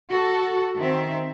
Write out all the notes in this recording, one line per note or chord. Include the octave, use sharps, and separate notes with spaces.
F#4 A4
D#3 C4 E5